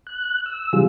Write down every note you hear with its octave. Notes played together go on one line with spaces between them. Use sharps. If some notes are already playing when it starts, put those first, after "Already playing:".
F#6
E6
C3 E3 F#3 G3 F4 G#4